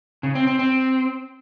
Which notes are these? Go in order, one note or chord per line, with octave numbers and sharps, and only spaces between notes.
C#3
C4
C4
C4